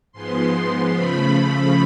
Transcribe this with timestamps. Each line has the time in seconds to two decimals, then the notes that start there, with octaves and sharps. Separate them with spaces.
0.12 G#2 F3 G#3 B3 C6
0.91 C#3 F3 A3 B5